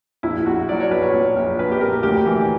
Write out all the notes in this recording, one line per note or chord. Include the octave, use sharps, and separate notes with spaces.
A#1 E4
A#1 F#4
F#3 D5
C#5
A#1 B4
C#5
A#2
A#1
A#1 B4
G4
A#2 A#4
D2 G4
E3